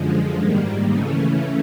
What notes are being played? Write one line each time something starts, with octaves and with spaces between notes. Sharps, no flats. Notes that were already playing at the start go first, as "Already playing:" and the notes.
Already playing: F#2 D3 F3 G#3
G#2 D#3 G3 A#3
C#3 E3 A3 C#4